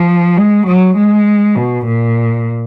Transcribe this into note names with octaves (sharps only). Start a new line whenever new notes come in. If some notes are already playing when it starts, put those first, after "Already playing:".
Already playing: F3
G#3
F#3
G#3
B2
A#2